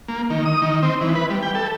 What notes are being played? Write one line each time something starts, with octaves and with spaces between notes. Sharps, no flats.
A#3
D#3
D#6
D#3
C4
E3
B4
G3
G5
A4